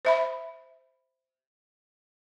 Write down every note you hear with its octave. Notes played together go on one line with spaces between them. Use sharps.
C5 E5 B5